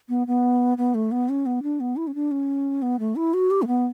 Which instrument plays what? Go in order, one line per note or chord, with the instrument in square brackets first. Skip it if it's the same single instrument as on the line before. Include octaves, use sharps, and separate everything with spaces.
[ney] B3
B3
B3
A3
B3
C#4
B3
D4
B3
E4
C#4
D4
C#4
B3
A3
E4
F#4
G4
A3
B3